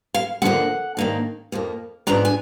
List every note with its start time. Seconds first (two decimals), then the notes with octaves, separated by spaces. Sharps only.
0.14 F5
0.42 D#2 D3 F3 A#3 F#5
0.97 G#2 D#3 A#3 D4
1.52 F2 F3 A#3
2.07 G#2 F3 B3 D4 A#5
2.25 G#5